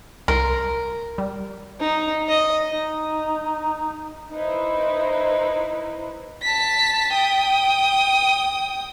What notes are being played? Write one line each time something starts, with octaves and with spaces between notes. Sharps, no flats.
C2 A#4 C6
G3
D#4
D#5
D#4
D#4 E4 B4 C5
A5 B6
G5 D#6